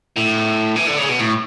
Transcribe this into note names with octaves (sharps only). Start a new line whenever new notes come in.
A2
E3
D3
C#3
B2
A2